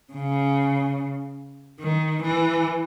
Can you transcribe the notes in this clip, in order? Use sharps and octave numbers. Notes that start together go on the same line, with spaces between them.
C#3
D#3
E3